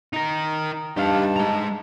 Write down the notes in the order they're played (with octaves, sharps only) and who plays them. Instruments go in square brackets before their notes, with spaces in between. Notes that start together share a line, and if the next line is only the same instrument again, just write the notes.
[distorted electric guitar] D#4 A#4
[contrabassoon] G2 [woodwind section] D#4 A5 [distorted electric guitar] G4 F5
[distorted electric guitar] G#3 A#5